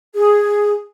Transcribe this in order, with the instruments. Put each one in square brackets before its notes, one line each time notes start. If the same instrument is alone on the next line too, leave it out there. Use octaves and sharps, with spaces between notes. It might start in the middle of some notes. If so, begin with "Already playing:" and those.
[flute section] G#4